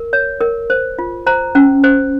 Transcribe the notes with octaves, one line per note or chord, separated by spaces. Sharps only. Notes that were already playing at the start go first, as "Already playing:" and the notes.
Already playing: A#4
C#5
A#4
C5
F4
C5 A#5
C#4
C5